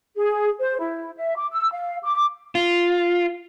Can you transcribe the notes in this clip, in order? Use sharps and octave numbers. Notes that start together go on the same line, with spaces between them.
G#4
C5
E4
E5
D6
E6
F5
D6
F4